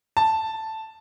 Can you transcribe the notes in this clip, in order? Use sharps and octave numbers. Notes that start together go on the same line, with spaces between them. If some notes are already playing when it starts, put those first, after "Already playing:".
A5